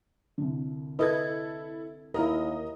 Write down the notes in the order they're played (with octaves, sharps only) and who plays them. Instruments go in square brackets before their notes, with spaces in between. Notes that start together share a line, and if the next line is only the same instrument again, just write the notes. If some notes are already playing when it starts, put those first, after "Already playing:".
[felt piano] C2 D3
[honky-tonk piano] E4 A4 G#6 [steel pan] B4 D#5
[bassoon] D#2 [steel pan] E4 A#4 [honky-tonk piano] D#5 A#5